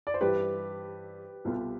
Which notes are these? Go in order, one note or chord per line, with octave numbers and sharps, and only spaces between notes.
D5
C5
G2 E3 G3 G4 B4
C2 B2 B3 F4 A4